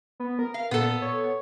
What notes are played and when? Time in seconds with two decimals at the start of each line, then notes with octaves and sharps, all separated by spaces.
0.20 B3
0.39 A#4
0.54 F5
0.71 A#2 B3 A4
1.02 C#5